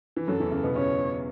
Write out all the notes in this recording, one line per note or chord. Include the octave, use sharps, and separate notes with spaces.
E3
F#2 F#3 A4
E2 E3
C#3
B2 B3
C#3 C#4 C#5